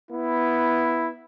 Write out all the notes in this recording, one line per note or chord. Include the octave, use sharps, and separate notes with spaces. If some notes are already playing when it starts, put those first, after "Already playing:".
B3 E4